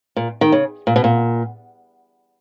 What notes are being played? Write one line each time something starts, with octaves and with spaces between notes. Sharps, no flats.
A#2
D#3
C#3
A#2
B2
A#2